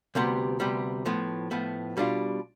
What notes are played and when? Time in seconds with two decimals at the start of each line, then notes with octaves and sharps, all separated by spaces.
0.15 D2 C3 G3 B3
0.60 D2 C3 G3 B3
1.06 A2 F3 B3
1.51 A2 F3 B3
1.97 B2 G3 D4 F4